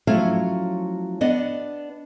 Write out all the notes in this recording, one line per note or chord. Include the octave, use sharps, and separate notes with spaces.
F3 F#3 A3 C#4 E4 F5
B3 D4 D#5 F#5